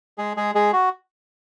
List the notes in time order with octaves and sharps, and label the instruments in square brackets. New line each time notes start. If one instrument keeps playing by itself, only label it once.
[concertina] G#3 G#4
G#3 G#4
G#3 G#4
F#4